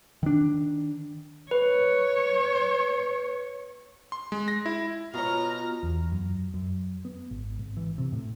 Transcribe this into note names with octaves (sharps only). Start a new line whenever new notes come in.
D#3 D4
B4 C#5
C6
G#3
A#6
E4
B2 F4 C#5 A#5 F6
E2
F#2
F#2
B3
G#1
G#1
E3
C3
A2